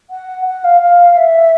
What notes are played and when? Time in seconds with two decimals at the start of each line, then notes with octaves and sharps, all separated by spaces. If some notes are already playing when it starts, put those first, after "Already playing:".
0.10 F#5
0.47 F#5
0.64 F5
0.82 F5
1.17 E5